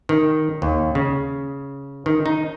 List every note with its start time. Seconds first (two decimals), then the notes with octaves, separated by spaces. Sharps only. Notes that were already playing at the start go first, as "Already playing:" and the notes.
0.09 D#3
0.62 D#2
0.95 C#3
2.06 D#3
2.26 D#4